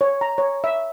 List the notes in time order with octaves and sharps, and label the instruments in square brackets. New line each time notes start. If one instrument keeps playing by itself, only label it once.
[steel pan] C#5
A#5
C#5
E5